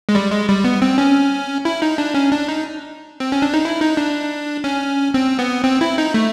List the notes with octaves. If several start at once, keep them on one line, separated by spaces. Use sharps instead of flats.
G#3
G3
G#3
G3
B3
C4
C#4
E4
D#4
D4
C#4
D4
D#4
C4
C#4
D4
D#4
E4
D#4
D4
C#4
C4
B3
C4
E4
D#4
A3